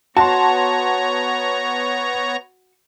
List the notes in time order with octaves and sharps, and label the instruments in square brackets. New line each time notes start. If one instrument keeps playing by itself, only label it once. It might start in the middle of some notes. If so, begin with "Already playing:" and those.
[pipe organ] B3 C#5 A#5 [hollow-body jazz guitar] F#4 [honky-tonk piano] A5 C6